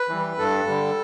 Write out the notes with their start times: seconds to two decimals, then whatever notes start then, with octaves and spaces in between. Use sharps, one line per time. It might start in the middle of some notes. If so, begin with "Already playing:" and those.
Already playing: B4
0.09 E3 G3
0.38 G2 A4
0.67 D3 G3